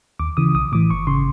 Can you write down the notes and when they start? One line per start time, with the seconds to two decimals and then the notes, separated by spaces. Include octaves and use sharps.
0.19 D#2 D6
0.37 C#3 E3 D#6
0.55 B1 D#6
0.72 A2 E3 D6
0.90 G1 C#6
1.07 C#3 C6